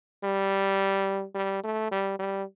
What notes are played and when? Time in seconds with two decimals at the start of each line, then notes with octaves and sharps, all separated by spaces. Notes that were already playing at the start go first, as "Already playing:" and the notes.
0.23 G3
1.35 G3
1.64 A3
1.91 G3
2.19 G3